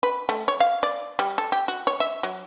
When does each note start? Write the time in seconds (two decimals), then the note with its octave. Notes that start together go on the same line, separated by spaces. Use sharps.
0.03 B4
0.29 A3
0.48 C#5
0.60 F5
0.83 D5
1.19 G3
1.38 A4
1.52 G4
1.68 F#4
1.87 C#5
2.00 E5
2.23 F#3